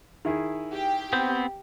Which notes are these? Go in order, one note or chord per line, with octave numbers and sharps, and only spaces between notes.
D#3 E4 G#4
G4
B3 C4 C5